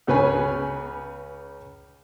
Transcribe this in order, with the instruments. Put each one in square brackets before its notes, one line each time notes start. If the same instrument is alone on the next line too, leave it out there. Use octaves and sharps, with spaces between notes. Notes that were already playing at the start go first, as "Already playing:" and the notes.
[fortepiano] C#2 C#3 B4 C#5 G#5